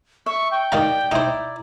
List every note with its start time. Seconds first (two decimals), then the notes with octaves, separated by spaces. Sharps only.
0.26 E5 C#6
0.51 G5
0.72 D#3 G4 D5 F5 A#5 D#6
1.11 D#4 E4 C5 D5 A#5